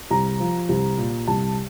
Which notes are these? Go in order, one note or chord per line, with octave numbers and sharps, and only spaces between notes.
C2 A#5
F3
C2
A#2
C2 A5